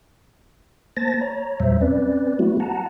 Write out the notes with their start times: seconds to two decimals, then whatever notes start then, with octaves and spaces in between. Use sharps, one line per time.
0.97 A#3 C5 A5 A6 A#6
1.21 C#5 A#5
1.60 E2 A#2 F#3 G3 C5 E5
1.81 C4 C#4 B4 D5
2.39 F#3 A3 B3 E4 F#4
2.60 F#5 A5 A#5